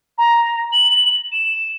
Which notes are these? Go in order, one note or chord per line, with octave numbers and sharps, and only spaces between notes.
A#5
F#7
E7